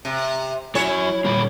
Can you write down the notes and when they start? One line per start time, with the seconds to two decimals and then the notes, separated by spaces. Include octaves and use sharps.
0.05 C3
0.75 F#3 E4 C#5 G#5
1.25 A#2 G3 A#3 F#4 B5